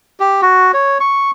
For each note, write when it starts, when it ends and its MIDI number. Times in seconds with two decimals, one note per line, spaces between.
0.20 0.41 67
0.42 0.72 66
0.74 0.98 73
1.00 1.31 85